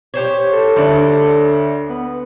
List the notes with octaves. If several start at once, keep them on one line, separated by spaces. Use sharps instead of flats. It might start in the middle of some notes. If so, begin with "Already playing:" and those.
G4 C5 C#5
A4
D2 D4
B3